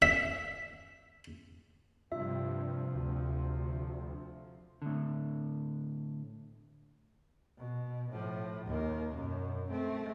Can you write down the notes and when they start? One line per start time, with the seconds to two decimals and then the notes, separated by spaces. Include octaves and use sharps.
0.02 E5
2.12 G2 C3 F3 F4 E5
2.95 D2
4.82 A2 D3
7.58 B2
8.11 A2 F3
8.66 D#2 A#3
9.14 F#2 B2
9.70 A3 C4